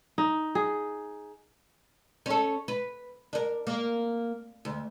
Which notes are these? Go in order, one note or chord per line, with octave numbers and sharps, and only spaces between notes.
D#4
G#4
C#4 A4
B4
D4 A#4
A#3
D2